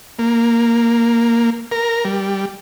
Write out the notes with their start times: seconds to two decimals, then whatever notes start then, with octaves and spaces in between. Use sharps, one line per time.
0.19 A#3
1.72 A#4
2.05 G3